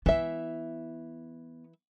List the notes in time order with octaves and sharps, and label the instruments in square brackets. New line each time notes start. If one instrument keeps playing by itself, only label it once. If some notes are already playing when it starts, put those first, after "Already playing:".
[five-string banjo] E3 E5 [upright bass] B3